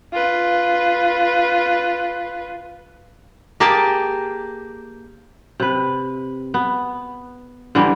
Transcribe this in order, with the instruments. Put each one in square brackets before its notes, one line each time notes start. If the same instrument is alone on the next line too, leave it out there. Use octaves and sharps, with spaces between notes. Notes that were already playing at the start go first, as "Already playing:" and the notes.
[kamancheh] F4 B4
[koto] A#3 G4 G#4 A5
[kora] C3 B4
B3
D3 E3 G3